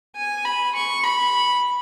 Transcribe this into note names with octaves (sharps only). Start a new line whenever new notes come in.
G#5
B5
C#6
B5